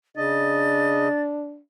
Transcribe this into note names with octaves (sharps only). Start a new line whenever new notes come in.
C#3 D4 D#5 A6